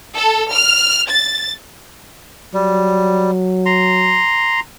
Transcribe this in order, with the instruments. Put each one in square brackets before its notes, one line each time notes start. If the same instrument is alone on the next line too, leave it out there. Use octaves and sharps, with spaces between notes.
[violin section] A4
F6
A6
[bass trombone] F#3 [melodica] G3
[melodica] A#5 C6